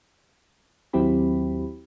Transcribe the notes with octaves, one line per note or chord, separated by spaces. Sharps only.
D#2 F#3 C4 E4 G4 B5